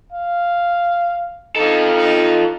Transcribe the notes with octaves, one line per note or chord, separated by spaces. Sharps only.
F5
D#4 F4 A4
D#4